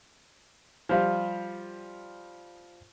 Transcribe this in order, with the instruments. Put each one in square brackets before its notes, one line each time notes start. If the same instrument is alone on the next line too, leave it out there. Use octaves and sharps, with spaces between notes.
[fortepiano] F3 G3 F4